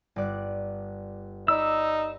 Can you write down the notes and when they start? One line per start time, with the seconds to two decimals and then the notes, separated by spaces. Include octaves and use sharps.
0.16 G1 D5 F#6
1.48 D#4 D5 B5 E6